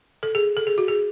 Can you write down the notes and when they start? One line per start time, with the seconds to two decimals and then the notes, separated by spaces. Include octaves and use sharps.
0.23 A4
0.35 G#4
0.57 A4
0.67 G#4
0.78 F#4
0.88 G#4